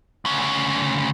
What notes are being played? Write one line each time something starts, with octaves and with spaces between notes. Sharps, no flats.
D2 C#3